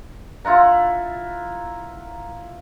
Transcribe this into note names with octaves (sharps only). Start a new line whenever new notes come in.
E4 F4 F#5 A#5